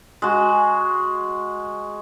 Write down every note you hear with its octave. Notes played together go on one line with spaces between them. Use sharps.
G#3 F#4